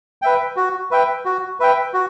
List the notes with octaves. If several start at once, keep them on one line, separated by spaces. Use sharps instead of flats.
B4 E5 G5
F#4
B4 E5 G5
F#4
B4 E5 G5
F#4